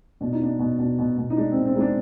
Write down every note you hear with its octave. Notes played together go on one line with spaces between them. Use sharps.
B2 D4
D#4
B3 D4
B2
B2 D4
B2
B2
D#4
G#3 D4
B2 C4
C4
G#3 D4 D#4